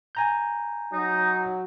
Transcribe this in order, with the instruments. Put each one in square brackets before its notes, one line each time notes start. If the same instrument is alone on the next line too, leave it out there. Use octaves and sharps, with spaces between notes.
[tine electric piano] G#5 A#5 G6
[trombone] F#3 [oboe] D#4